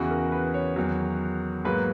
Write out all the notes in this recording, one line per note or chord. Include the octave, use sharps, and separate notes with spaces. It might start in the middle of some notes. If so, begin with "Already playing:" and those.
Already playing: E2 C#3 E3 F#4
A#4
B4
C#5
E2 D#3 F#3
G#2 F#3 A#3 B4